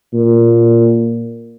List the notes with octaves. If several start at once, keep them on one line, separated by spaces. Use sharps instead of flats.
A#2